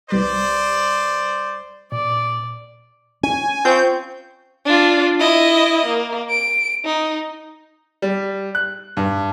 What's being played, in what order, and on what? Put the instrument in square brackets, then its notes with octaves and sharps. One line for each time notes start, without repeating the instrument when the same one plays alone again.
[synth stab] C2 G3 B4 [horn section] C5 D5
[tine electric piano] A#2 [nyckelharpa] D5
[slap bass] C#4 [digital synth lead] G#5
[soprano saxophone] C4 [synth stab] F4 C5 C#6 [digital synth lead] G6
[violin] D4 F4
E4 D#5
A#3
D7
D#4
[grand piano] G3
F#6
G2